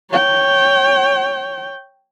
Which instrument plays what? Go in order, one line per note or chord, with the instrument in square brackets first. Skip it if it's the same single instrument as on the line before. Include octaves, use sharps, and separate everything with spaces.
[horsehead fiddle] C#5 G5